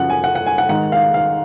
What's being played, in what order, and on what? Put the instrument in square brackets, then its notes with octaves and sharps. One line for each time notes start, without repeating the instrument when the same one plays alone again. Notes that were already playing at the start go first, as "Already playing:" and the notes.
Already playing: [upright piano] F#2 C#3 F3 F#5
G#5
F#5
F#5
G#5
F#5
G#2 D#3 G#3 F#5
F5
F5